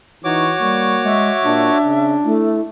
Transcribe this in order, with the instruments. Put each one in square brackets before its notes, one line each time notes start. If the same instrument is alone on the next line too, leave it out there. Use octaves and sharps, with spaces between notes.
[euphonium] E3 [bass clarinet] D#4 [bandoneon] F#4 C#5 D6
[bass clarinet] G3 [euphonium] A#3
[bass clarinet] G#3 [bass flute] E5
[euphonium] A#2 [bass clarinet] D4
[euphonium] C#3
[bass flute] A3 [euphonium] E4